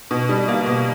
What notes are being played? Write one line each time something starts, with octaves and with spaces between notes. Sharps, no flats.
B2
G3
A#3
B2